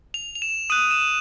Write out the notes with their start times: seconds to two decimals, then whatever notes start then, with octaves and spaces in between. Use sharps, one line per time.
0.14 F7
0.35 F7
0.42 E7
0.70 D#6 F#6 D#7
0.91 E7